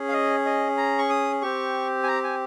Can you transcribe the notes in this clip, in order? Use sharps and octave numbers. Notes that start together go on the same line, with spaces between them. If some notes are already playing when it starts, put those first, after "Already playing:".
Already playing: C#4 G#4
F5
D#5
D#5
A#5
C#6
D#6
C4 G4 C#6
G#5
A#5
G#5